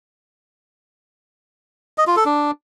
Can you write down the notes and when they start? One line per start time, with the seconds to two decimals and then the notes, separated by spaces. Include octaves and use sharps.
1.98 D#5
2.07 F4
2.16 A4
2.25 D4